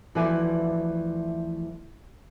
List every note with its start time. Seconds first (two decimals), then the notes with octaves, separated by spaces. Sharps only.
0.15 D2 E3 F3 F#4 D5 G#5